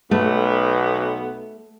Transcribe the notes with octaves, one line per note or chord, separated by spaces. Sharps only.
B1 A3 B3